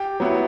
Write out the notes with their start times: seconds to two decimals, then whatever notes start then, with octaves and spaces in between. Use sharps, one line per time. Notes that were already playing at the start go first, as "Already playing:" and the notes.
Already playing: G4 G5
0.20 F#3 B3 E4